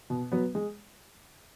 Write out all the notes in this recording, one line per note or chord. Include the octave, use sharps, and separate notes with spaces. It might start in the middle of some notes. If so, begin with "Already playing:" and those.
B2
F#3 B3
G#3